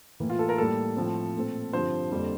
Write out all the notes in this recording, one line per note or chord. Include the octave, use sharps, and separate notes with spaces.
A2 E3 A#3
F4
A4
A#4
A2 G3 A#3 A4
A2 F3 C4
A#2 A3 C4
G2 D3 F3 C4 C5
F2 D3 G3 A#3